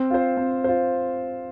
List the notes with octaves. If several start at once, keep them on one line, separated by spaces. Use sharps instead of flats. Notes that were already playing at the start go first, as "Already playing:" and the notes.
Already playing: C4
F4 C5
C4
F4 C5